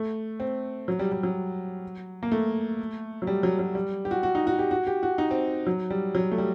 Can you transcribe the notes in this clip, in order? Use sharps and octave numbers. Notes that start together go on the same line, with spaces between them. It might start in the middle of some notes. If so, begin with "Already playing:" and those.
Already playing: A3
C4
F#3
G3
G3
F#3
A#3
A3
F#3
G3
F#3
F#3
G3
G4
F#4
F#4
D#4
F#4
G4
F#4
G4
F#4
D#4
C4
F#3
G3
F#3
A3
G3